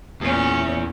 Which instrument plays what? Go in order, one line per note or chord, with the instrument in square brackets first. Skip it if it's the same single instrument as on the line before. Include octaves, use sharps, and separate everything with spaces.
[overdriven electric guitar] E2 [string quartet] A#2 C#4